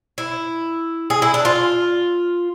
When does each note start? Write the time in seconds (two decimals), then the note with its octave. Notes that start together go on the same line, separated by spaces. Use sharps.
0.18 E4
1.10 G#4
1.22 E4
1.34 D4
1.45 F4